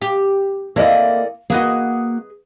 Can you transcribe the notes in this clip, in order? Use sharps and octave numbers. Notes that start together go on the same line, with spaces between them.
G4
A#3 C4 E4 A4 D5 D#5
A#3 F#4 G#4 B4 D#5